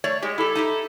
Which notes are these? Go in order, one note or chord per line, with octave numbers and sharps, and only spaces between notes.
A3 C#5 D5
G#3 G4 C#5
E4 G4 A4
D#4 E4 G4